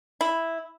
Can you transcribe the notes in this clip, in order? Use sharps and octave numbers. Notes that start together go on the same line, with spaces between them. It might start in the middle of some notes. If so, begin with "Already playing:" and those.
E4